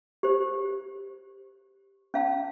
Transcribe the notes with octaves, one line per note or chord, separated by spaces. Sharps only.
G4 C5
C#4 F5 A5